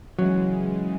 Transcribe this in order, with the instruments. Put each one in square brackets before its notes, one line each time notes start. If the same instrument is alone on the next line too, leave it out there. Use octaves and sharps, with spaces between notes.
[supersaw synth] C#3 E3 G#3 [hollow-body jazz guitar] F#3